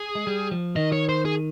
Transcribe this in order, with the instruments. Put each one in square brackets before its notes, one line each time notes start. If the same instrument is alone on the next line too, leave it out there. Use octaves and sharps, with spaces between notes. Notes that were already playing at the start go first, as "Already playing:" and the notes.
Already playing: [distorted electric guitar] G#4
[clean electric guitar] G#3
G3
F3
[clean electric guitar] D#3 [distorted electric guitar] D#5
[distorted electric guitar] C#5
C5
G#4